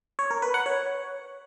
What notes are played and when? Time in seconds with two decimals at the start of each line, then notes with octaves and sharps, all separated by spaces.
0.19 C#5
0.31 A#4
0.42 B4
0.54 F#5
0.66 C#5